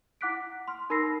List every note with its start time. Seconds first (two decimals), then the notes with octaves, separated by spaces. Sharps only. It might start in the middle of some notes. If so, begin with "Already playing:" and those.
0.21 E4 F#5 D6 F#6 B6 D7
0.68 C6 F6
0.90 D#4 A#4 B5 E6 A#6 C7